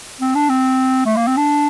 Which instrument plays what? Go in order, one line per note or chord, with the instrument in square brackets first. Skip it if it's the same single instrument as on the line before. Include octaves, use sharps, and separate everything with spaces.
[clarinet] C4
D4
C4
A3
A#3
C4
D4